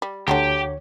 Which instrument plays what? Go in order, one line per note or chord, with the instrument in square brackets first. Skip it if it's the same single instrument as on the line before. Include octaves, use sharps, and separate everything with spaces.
[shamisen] G3
[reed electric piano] D2 C#5 [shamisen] D3 D#3 F#3 [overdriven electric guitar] G4